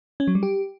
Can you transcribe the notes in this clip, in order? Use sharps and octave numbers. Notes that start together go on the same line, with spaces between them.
C#4
F#3
G3
G4